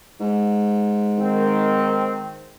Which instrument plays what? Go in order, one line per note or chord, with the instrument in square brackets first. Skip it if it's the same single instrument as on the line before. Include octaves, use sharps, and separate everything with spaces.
[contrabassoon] G#2
[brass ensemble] D#3 C4